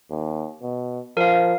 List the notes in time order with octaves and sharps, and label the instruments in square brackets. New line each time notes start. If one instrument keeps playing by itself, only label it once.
[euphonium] D#2
B2
[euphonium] F3 [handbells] A#4 F5